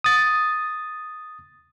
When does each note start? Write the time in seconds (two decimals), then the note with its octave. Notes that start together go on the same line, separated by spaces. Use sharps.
0.04 D#6 A6